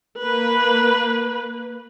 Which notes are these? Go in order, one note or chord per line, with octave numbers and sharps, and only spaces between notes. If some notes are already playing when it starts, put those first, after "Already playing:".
A#3 B4